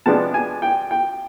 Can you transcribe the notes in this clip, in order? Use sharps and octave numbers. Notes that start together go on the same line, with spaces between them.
C3 F3 G#3 B3 D4 A5
G#5
G5
G5